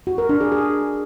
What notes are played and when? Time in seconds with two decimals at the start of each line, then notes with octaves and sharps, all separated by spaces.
0.07 F#4
0.18 A#4
0.29 D4
0.41 G#4
0.52 G#4